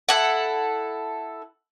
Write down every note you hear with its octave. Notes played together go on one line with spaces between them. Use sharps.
E4 A4 F#5